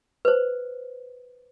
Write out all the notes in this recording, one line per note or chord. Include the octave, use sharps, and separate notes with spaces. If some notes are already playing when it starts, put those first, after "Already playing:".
B4 C5